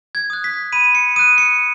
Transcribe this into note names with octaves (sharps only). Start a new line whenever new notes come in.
G#6
D#6 F#6
B6
B5 D#7
C#7
D#6 F#6 D#7
C#7